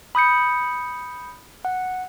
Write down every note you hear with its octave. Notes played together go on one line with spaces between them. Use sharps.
B5 D#6 G6 C#7
F#5